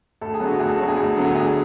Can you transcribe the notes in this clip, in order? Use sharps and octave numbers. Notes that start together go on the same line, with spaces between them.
D2 A4
G#4
D3 F#3 B3
F#4
D2 G#4
A4
D3 F#3 B3 F#4
G#4
D2
D3 F#3 B3
D2 G#4